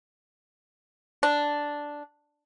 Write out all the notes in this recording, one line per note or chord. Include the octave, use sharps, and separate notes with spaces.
D4